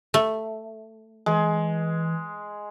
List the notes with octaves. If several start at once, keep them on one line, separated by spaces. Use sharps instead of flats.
A3
E3 G#3